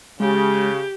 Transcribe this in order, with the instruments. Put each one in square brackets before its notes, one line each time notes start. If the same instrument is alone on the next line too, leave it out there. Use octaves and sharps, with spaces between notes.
[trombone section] C#3 [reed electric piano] G#3 [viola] G4